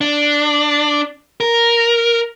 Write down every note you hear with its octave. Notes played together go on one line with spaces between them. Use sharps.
D4
A#4